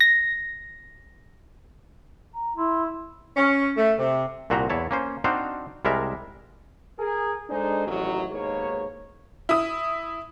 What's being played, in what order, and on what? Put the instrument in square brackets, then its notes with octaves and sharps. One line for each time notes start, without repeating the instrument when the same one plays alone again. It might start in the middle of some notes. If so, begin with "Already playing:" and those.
[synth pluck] A#6
[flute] A#5
[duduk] E4 [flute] C6
[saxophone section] C#4
A3
C3
[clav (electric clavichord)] C2 A#2 F#4 C5 E5 A#5
E2 E4 C#5 A5
A#3 C#4 C5
C4 D4 D#4 F#4 C5 F5
C2 G3 G#3 A#4 E5
[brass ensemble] G#4 A#4
G#3 D4 D#4 G#4 A4 C5
A1 D#3 F#3
D#2 G#2 B2 A#3 C#5
[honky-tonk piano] E4 D#6